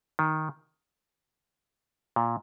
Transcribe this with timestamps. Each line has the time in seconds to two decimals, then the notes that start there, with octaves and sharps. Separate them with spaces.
0.19 D#3
2.16 A#2